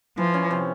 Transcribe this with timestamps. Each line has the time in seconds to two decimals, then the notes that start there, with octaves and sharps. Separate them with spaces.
0.17 E3 F3
0.34 C#4
0.51 C3